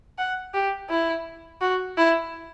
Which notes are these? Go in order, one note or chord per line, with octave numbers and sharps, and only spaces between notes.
F#5
G4
E4
F#4
E4